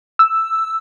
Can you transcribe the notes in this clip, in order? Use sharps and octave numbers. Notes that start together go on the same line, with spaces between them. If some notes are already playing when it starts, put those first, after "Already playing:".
E6